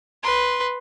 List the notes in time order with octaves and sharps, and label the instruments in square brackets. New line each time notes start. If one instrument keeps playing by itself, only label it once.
[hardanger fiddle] B4 C6